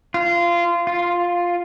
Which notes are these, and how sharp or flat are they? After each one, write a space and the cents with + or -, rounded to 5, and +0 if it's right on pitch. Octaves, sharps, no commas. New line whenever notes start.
F4 -20
F4 +5